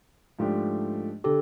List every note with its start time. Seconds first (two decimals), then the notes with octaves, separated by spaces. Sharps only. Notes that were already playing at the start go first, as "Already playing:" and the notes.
0.39 G#2 F3 A3 D4 G4
1.24 D3 G4 A4